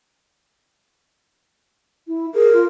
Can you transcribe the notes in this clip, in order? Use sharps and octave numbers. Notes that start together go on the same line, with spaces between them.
E4
G#4 A#4
F4